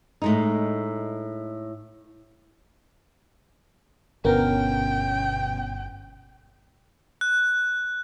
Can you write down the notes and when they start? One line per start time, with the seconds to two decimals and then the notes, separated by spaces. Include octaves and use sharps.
0.22 A2 G#3 D#4
4.25 G1 B2 B3 C#4 A#4 G5
7.21 F#6